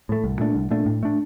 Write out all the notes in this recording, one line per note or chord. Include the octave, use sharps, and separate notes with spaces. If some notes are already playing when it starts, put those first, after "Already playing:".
A2 A3
C2
A#2 A3 D4
C2
A#2 A3 D4
A2
A3 D4